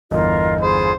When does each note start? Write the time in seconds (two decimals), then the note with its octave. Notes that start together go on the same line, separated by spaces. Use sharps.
0.11 G1 E2 F4 A#4 D#5
0.61 F4 G#4 C5 B5